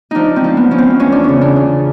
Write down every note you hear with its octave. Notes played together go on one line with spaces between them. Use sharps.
F3 D4 D#4
C4
F3
B3
F3 C#4
C4
E2 C#4
D4
C#3 C#4
D4
C#3